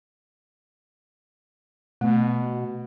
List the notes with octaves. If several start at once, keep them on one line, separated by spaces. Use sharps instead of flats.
B2 A3